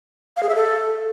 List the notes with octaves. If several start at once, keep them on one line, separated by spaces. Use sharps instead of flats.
F5
G#4
E5
A4